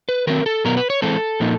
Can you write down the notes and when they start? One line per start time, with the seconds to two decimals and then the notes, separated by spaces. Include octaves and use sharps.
0.09 B4
0.27 D#3 F#3 A3 C4 A#4
0.46 A4
0.65 B2 F#3 B3 A#4
0.77 B4
0.90 C#5
1.02 E3 G#3 C4 A4
1.40 A#2 F3 A#3 D#4